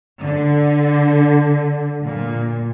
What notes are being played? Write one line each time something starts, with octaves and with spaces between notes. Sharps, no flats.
D3
A#2